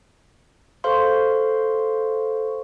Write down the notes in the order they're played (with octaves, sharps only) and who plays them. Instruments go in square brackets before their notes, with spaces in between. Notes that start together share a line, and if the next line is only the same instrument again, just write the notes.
[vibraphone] A4 C#6 [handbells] C5 F5 C6